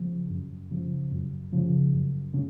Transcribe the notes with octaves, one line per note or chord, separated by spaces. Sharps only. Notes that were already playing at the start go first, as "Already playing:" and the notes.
Already playing: C#3 F3
F#2
C#3 F3
F#2
C#3 F3
F#2
C#3